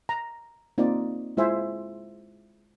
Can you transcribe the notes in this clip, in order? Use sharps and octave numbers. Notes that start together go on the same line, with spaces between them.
A#5
A#3 C4 D#4 F4 D5
G#3 E4 F4 C5 E5 G#5